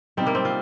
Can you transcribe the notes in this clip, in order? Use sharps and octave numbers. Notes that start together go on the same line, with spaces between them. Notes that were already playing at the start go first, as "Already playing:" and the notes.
C3 G3 C4 D#4
A#3
C4
F4